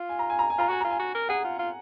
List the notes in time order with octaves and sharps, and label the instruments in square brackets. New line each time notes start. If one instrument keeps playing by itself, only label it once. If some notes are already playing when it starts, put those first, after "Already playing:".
Already playing: [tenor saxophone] F4
[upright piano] G#5
A#5
G#5
A#5
G#5
[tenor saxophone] F4 [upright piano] A#5
[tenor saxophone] F#4 [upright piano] G#5
[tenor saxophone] F4 [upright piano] A#5
[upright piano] G#5
[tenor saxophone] F#4
A#4
[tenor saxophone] G#4 [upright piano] F#5
[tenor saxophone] F4
F4